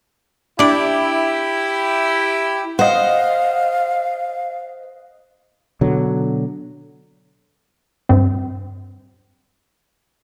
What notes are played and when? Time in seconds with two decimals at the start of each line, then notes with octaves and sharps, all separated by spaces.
0.59 D4 E4 G4 D5
2.79 C5 D#5 F5 F#5
5.81 B2 D3 F#3
8.09 G2 C4